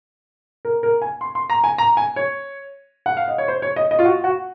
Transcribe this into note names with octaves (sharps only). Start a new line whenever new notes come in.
A#4
A#4
G#5
C6
C6
A#5
G#5
A#5
G#5
C#5
F#5
F5
D#5
C#5
C5
C#5
D#5
D#5
F4
F#4
F#4